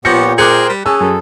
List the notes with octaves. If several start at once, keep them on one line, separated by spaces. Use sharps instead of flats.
A#2 F3 B3 G4 C#5 G6 A#6 C#7
G#4 A#4 C5 G5 D6 F#6 C#7
G3
C#4 G#4 A5 E6
F#2 A4